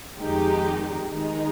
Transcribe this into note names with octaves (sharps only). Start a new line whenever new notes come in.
F2 D#3 G#3 D#4 G4
D#3 G#3 D#4